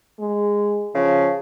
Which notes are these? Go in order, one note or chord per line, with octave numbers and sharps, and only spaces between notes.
G#3
C#3 F3